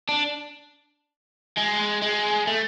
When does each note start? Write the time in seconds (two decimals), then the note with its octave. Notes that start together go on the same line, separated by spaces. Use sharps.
0.09 D4
1.58 G#3
2.02 G#3
2.47 A3